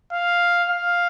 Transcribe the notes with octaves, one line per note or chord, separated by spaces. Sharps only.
F5
F5